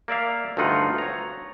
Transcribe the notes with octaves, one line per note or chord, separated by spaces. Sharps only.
A#3 D5 E5 F5
D2 G2 A3 D#4 F4 F#5
C#5 A#5